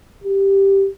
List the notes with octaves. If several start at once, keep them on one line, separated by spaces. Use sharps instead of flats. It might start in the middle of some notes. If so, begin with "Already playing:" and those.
G4